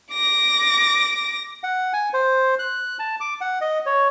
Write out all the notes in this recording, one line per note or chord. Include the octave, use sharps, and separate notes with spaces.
D6 A#6
F#5
G#5
C5
F#6
A5
D6
F#5
D#5
C#5